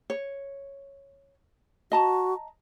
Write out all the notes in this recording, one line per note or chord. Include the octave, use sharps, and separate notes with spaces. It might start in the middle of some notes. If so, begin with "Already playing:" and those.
C#5
F#4 D#5 A5 A#5